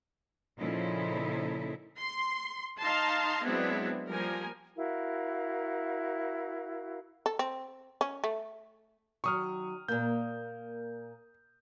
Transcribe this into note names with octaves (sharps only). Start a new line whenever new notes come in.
A#2 C#3 F3 D#4 E4 A4
C6
D#4 F5 A5 A#5 C6
F#3 G#3 B3 C4 D4 E4
F3 G3 A#3 A#4 G#5
E4 F#4 A#4 F5
A4
C4
C#4
A3
D#3 F#3 C#6 D#6 F6
A#2 A#3 G6